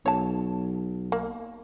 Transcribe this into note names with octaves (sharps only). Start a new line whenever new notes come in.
B1 C#5 A5
A#3